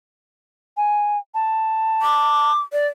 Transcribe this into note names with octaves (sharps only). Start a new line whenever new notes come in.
G#5
A5
D6
D5